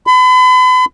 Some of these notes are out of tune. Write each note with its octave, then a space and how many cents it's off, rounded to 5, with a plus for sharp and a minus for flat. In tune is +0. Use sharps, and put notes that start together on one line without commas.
B5 +40